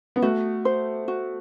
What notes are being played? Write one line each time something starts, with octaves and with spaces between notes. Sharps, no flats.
B3
A3 F#4
C5
F#4